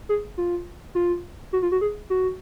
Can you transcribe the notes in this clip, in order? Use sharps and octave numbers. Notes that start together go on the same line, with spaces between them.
G#4
F4
F4
F#4
F4
F#4
G#4
F#4